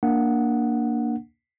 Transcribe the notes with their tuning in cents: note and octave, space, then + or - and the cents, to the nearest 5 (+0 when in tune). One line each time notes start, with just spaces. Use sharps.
A#3 +0 D4 +0 F#5 -5